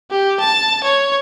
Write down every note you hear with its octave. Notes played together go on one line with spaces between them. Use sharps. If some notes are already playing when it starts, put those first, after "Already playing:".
G4
A5
C#5